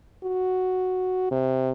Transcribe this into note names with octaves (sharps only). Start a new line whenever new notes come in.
F#4
C3